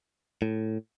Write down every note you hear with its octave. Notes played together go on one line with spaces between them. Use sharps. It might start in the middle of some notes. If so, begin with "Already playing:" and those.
A2